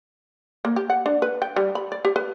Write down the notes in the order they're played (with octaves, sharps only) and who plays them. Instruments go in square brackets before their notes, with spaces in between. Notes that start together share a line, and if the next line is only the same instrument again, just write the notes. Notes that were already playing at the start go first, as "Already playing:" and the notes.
[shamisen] A#3
G4
F#5
D4
B4
G5
G3
B5
D5
G4
B4